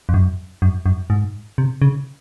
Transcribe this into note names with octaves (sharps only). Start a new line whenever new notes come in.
F2
F#2
F#2
F#2
G#2
C3
C#3